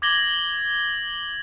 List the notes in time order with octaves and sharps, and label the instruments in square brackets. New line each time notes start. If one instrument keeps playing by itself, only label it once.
[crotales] D6 G#6 A#6 F#7 G7